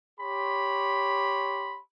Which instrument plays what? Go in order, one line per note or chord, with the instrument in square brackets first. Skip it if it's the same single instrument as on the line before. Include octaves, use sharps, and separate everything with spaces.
[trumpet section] G4 C#5 B5 C6